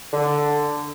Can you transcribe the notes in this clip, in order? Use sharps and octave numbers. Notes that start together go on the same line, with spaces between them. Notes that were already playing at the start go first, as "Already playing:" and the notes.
D3